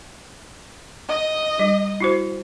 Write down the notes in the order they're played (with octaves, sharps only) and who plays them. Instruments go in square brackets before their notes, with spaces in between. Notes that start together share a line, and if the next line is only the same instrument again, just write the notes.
[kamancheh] D#5
[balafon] G3
E4 F#4 C5